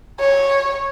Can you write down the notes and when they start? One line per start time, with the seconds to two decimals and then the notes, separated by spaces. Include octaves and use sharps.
0.19 C#5